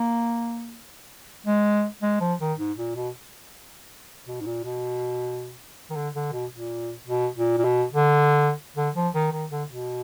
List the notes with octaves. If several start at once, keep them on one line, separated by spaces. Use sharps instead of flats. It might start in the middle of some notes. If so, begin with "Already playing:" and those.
Already playing: A#3
G#3
G#3
F3
D#3
G#2
A#2
B2
B2
G#2
A#2
B2
D#3
D3
D3
B2
A#2
B2
A#2
A#2
B2
D3
D3
F3
D#3
D#3
D3
B2